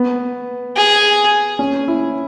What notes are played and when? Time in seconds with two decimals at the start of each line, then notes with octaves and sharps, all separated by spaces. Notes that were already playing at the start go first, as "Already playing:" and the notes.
Already playing: B3
0.76 G#4
1.59 C#4
1.88 E4